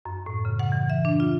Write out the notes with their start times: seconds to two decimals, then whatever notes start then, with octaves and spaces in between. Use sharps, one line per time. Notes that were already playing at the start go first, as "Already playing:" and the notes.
0.05 F#2
0.26 A2
0.45 C#3
0.59 F#5
0.72 E3
0.90 E5
1.05 D4
1.20 F4